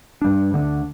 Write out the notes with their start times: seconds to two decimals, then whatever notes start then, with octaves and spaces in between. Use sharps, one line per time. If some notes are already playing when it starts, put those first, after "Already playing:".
0.22 G2 G3 D4
0.53 D2 D3 B3 D4